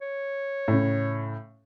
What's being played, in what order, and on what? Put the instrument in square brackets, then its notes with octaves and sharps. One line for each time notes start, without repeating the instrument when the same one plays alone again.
[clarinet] C#5
[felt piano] A2 C#3